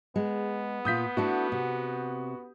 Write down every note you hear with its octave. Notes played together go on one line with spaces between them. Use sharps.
G#3 B3
A#2 F4 D#6 G6 B6
A3 D4 E4 F#4
C3